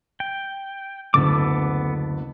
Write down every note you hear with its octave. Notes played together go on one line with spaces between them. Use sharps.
G5
F#1 D2 B3 A4 D6